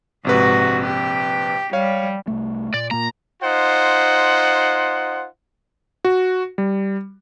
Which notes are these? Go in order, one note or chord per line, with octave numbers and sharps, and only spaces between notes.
A#1 G#2 C3 F#4 B4
G4
G3 C#5 F5
C2 A3
A#2 D5
A#2 A#3 A#5
D#4 F4 C5 F#5
F#4
G3